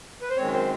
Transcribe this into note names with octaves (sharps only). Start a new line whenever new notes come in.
B4
C5
F#2 D#3 G#3 C4 C#5
C5